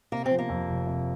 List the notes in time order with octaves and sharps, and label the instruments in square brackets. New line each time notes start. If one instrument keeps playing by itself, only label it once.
[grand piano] C3 [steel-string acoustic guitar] A#3
[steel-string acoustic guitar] C4
[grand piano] F3
[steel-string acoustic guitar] A#3
[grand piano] F2
F1
C3